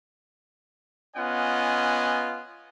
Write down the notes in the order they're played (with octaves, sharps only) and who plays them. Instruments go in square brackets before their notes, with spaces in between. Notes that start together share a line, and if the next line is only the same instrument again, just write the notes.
[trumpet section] B3 C#4 F4 D#5 F#5 G#5